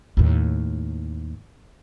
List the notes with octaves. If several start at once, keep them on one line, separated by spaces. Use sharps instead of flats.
D#2 A2